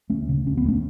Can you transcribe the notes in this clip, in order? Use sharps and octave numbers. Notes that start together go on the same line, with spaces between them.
D2 A3 C#4
C#3
D2 C#4
B3
D2
A3 C#4